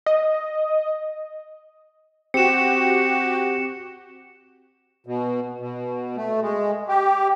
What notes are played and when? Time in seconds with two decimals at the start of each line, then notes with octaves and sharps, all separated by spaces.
0.06 D#5
2.34 C4 F#4 G4 C#7 E7
5.06 B2
5.60 B2
6.17 A3
6.43 G#3
6.89 G4